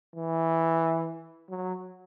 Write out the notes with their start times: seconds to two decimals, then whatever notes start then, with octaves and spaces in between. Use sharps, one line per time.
0.15 E3
1.50 F#3